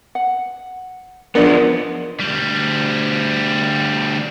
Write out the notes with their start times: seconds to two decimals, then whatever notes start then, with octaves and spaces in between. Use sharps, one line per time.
0.15 F#5
1.35 F3 B3 D4 G#4 A#4 D5 D#5
2.20 D2 G3